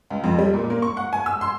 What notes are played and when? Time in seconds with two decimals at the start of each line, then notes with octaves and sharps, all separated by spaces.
0.10 C#2
0.24 F2
0.38 G3
0.54 A#2
0.70 A#3
0.82 C#6
0.97 F#5
1.13 G#5
1.26 E6
1.41 C6